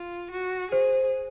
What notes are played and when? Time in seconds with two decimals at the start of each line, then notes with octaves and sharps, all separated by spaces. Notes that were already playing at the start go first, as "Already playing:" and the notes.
Already playing: F4
0.31 F#4
0.72 G#4 C5